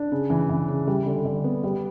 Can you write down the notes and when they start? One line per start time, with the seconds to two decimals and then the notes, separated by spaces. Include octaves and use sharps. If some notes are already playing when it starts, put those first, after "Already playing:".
Already playing: D4
0.12 C#3
0.30 E3
0.49 E3
0.68 C#3
0.87 G3
1.06 D3
1.25 D3
1.44 B3
1.64 G3